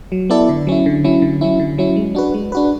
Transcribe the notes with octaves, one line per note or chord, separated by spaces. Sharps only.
F#3
B3 E4 A4 D5
D3
F#3 C#4 E4
D3
F#3 C#4 E4
D3
F#3 C#4 E4
D3
F#3 C#4 E4
G#3
D4 F#4 B4
G#3
D4 F#4 B4